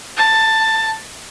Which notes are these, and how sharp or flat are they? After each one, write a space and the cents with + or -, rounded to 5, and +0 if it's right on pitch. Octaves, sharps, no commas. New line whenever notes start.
A5 +10